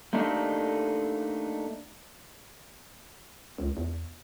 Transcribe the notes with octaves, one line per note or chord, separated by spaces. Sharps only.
A3 A#3 D4 D#4 G4 A4
C#2
E2